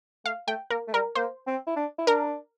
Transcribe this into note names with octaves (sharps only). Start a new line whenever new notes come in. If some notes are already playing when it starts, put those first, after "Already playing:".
A3 F5
A3 G5
A#3 A#4
A3
G3 A#4
A#3 C5
C4
E4
D4
E4
D4 A#4